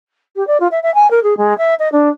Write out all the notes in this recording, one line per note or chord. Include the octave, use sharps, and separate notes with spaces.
G4
D5
F4
E5
E5
G#5
A#4
G#4
G#3
E5
D#5
D4